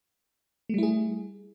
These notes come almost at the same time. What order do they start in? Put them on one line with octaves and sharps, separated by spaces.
A3 G3 E4 G#4